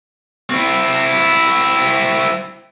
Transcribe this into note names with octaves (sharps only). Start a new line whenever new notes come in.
C4 E4